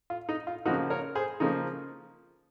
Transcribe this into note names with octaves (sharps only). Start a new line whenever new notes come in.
F4
D#4
F4
C#3 F3 A#3 D#4 F#4
A#4 C#5
G#4 C5
C#3 F3 A#3 D#4